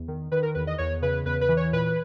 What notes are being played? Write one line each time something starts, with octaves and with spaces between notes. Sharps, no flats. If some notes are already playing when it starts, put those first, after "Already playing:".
Already playing: E2
D#3
D#3 B4
A#4
E2 B4
D#5
E2 C#5
C#3 B4
E2 B4
B4
E3
C#5
A#2 B4